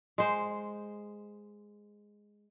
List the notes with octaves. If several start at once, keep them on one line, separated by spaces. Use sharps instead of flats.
G#3 C5